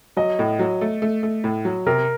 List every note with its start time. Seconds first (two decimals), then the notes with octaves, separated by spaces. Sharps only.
0.17 F#3 D#5
0.39 A2
0.59 F#3
0.81 A3
1.02 A3
1.23 A3
1.44 A2
1.65 F#3
1.86 C3 A#4